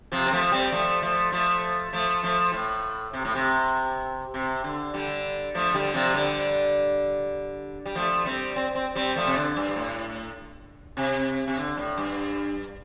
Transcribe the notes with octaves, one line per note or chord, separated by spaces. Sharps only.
C3 F3
C4
F3 A3
G3 C4
F3 A3
F3 A3
F3 A3
F3 A3
F3 A3
A2
C3
A2
C3
C3
D3
D3 G3
F3 A3
D3 G3
C3 F3
D3 G3
G3
F3 A3
G3 C4
C4
C4
G3 C4
F3 A3
C3
D3
G2
A2
C3
C3
D3
A2
G2